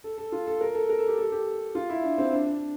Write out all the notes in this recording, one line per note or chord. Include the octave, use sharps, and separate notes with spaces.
A4
A4
F4
A4
A#4
A4
A#4
A4
G4
A4
G4
F4
E4
D4
C4
D4
D4